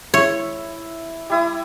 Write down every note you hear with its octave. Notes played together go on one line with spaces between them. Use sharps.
E4 C#5
G3 E4 D#6